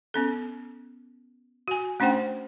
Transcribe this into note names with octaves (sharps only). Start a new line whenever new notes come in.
B3 C#4 A4
F#4 G#5
A3 C#4 D4 C5 F#5 G5